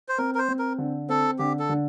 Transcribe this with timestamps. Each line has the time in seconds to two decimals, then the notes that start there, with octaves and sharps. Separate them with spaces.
0.09 C5
0.18 C4 A#4
0.35 A#4
0.38 C5
0.49 C4
0.59 A#4
0.78 D3
1.09 C4 A4
1.39 D3 G4
1.59 A4
1.69 D3